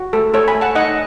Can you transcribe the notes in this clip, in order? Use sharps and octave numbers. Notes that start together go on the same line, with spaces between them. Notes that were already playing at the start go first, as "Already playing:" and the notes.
Already playing: F#4
A3 A4
A3 A4 C#5
G#5 B5
A3
F#5 A5
D#4 D#5 F#5